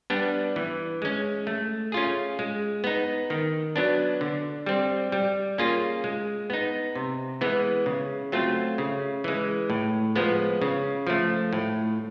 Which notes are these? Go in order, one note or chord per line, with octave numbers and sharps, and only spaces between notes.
G3 B3 D4
E3
G#3 C#4
A3
C#4 F4 G#4
G#3
B3 D#4
D#3
F#3 B3 D4
D3
G3 C4
G3
A#3 C#4 F4 G#4
G#3
B3 D#4
C3
E3 G#3 B3
C#3
F#3 A3 C4 F4
C#3
E3 G#3
A2
F3 G#3 B3
C#3
F3 A3
A2